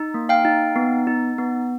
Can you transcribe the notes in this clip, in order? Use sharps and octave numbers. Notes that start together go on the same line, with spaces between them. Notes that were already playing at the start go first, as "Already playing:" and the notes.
Already playing: D#4
A#3
F5 G5
D#4
B3
D#4
B3